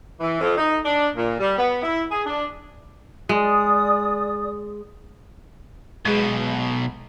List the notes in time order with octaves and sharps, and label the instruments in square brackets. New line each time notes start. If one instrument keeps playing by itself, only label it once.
[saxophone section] E3
F2
D#4
D4
A#2
G3
B3
E4
G#4
D4
[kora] G#3 [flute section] D5 D#6
[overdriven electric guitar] B1 B2 [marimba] G#3 G#4